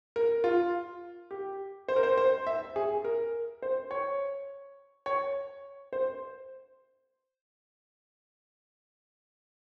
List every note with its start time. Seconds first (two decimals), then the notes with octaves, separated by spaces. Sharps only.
0.16 A#4
0.44 F4
1.31 G4
1.88 C5
1.96 A#4
2.03 C5
2.17 C5
2.47 E5
2.76 G#4
3.04 A#4
3.62 C5
3.91 C#5
5.06 C#5
5.93 C5